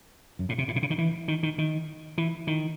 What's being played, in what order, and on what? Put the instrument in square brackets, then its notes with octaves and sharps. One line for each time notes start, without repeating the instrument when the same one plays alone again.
[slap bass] F#2
A2
C3
A2
C3
C#3
D#3
E3
D#3
D#3
D#3
E3
D#3